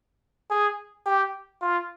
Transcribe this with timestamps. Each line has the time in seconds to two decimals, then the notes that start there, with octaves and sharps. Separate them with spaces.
0.51 G#4
1.06 G4
1.62 F4